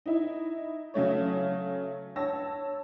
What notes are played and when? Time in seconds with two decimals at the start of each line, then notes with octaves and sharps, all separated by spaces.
0.06 D#4 E4
0.94 C#3 F#3 A3 C#5
2.16 C#5 A5 E6 A#6